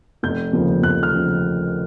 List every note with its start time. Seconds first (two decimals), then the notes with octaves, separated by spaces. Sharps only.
0.23 F1 G6
0.53 D#2 C#3 F3
0.82 F1 F#6
1.03 F6
1.12 C#3 F3